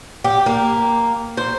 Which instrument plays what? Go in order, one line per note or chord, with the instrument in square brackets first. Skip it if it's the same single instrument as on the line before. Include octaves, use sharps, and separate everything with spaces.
[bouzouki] G4
A#3
C5